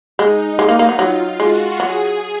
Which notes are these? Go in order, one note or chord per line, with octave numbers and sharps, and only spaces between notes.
G#3 D#4
G#3
A#3
A#3
F#3
F#3 F4
G#3 F#4
F#3 G#4